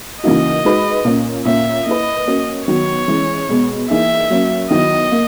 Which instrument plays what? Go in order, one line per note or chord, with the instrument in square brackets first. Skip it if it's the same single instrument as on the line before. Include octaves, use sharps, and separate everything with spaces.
[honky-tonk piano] C#3 E3 A#3 D#4 F#4 [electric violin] D#5
[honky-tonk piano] G#3 D#4 F#4 B4
A#2 A#3 C#4
[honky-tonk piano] A#2 A#3 C#4 [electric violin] E5
[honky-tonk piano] A#3 E4 B4 [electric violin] D#5
[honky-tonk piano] A#3 C#4 F#4 A#4
[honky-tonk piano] D#3 F#3 B3 F#4 [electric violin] C#5
[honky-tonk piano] E3 G#3 C#4
B2 G#3 B3
[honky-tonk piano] E3 A#3 D#4 G#4 [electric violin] E5
[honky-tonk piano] F#3 A#3 C#4
[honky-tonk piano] D#3 F#3 B3 E4 [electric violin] D#5
[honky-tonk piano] A#3